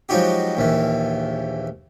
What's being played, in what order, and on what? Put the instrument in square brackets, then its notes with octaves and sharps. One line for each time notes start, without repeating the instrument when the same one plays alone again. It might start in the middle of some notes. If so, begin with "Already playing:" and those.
[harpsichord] F3 F#3 G#3 D#4 F#4 G4
A#1 D#2 E3